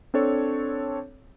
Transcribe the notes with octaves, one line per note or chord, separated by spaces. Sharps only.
C4 D4 A4 C#5